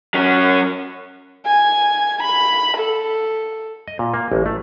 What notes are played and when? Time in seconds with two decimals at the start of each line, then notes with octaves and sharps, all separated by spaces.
0.14 F#3 C#4
1.46 G#5
2.23 B5
2.77 A4
3.88 D#5
3.99 A#2
4.14 A#3
4.32 A1
4.46 A3